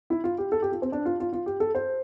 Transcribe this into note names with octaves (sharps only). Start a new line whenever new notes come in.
E4
F4
G4
A4
G4
F4
C4
D4
F4
F4
F4
G4
A4
C5